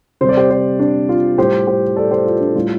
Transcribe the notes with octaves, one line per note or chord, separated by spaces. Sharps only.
C3 G3 C5
D5
G4 C5
G4 C5
D4
F4
A2 G3 G4 C5
G4 C5
A4 D5
G4 C5
F4
D4
A2 G3 F4